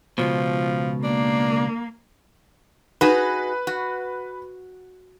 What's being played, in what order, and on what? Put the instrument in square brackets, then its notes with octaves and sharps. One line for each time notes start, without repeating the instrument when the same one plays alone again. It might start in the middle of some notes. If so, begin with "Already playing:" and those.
[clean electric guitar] C#2 G2 B2 [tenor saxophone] F3
[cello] A#3 [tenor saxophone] D4
[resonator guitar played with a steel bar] D#4 F#4 G#4 [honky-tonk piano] B4
[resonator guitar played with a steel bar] F#4